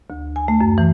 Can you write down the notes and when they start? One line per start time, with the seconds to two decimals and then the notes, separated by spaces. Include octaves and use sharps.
0.10 D2
0.36 G#5
0.48 A3
0.61 F#2
0.78 E3